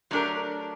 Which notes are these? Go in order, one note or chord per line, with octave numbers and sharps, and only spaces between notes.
F#3 A3 D4 G4 A#4